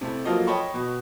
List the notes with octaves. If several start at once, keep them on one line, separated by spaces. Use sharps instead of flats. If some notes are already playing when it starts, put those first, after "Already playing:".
C3 A3 E4
F3 F#3 A#3 F4 A4 D#5
C#5 D#5 G5 A5 B5 C#6
B2